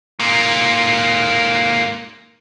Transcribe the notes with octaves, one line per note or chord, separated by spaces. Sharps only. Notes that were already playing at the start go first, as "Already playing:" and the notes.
G#2 A#3